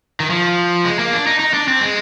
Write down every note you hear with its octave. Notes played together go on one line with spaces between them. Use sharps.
D#3
F3
G#3
A#3
D4
D#4
D#4
D4
C4
G#3